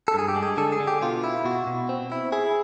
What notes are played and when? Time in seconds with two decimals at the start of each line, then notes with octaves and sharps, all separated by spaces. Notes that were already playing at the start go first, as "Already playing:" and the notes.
0.08 A4
0.14 G2 G#4
0.28 G4
0.36 G#3
0.43 G#4
0.57 D3 A4
0.72 G#4
0.80 D3
0.87 G4
1.02 B2 F4
1.24 E4
1.45 B2 F#4
1.67 B2
1.89 C4
2.12 E4
2.32 E4 G#4